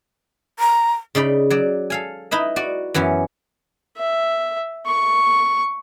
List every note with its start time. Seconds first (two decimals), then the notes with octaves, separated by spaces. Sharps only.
0.59 A#5
1.15 C#3 D#4 D5 B5
1.50 F#3 D5
1.90 A4 F5 G#5
2.31 D#4 E4 B4 D#5
2.56 F#4 D5
2.94 F#2 E3 B3 C#4
3.98 E5
4.86 C#6